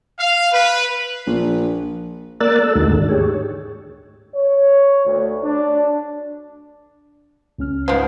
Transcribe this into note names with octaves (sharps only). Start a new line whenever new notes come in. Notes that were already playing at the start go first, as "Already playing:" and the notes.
F5
B4
A#1
A#3 A#4 D5 E6 F#6 A6
A4 E6
D#2 D3 G#3 A3 D#4 F#4
G#2 D#3 D4
G4 G#4 C#5
C#5
D2
D4
C#2 C#4 F6
G#2 F3 B3 C5